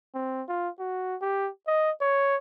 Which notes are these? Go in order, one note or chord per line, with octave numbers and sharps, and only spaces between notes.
C4
F4
F#4
G4
D#5
C#5